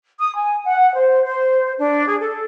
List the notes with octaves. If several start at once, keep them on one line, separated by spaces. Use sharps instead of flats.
D#6
G#5
F#5
C5
C5
D4
G#4
A4